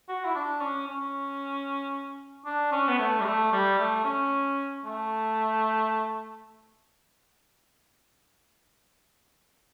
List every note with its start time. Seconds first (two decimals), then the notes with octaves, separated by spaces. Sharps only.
0.09 F#4
0.25 E4
0.35 D4
0.61 C#4
0.87 C#4
2.46 D4
2.72 C#4
2.89 B3
2.99 A3
3.20 G3
3.25 A3
3.53 G3
3.79 A3
4.04 C#4
4.85 A3